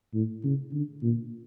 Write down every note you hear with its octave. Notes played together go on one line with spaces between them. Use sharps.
A2
C#3
D3
A#2